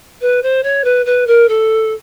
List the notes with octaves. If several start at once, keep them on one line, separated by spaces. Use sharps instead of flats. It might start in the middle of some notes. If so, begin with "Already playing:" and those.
B4
C5
C#5
B4
B4
A#4
A4